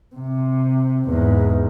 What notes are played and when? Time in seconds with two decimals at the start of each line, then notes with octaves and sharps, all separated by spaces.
0.15 C3
1.07 E2 G#2